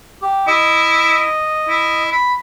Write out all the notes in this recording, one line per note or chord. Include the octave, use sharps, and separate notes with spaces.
G4
E4 D#5
E4
B5